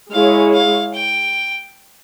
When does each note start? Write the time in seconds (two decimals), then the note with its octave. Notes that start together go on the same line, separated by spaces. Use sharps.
0.11 G#3 E4 G#4 C#5 F5
0.54 F5
0.94 G5